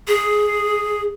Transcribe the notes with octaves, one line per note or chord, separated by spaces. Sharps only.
G#4